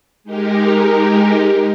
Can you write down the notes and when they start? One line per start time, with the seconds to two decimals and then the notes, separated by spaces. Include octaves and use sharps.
0.24 G#3 D#4 G4 A#4